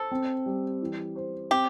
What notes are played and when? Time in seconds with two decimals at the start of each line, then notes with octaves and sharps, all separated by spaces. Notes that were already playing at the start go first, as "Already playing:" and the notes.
Already playing: A4 C5
0.11 C4
0.46 G3
0.81 E3
1.16 C5
1.50 C4 G4